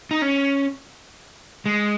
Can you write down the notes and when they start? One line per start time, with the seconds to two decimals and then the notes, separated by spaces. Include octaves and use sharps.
0.11 D#4
0.22 C#4
1.66 G#3